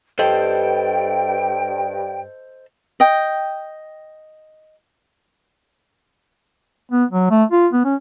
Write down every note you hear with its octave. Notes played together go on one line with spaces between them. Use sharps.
G2 A4 C5 D#5 G5
D#5 G5
B3
F#3
A3
F4
B3
C#4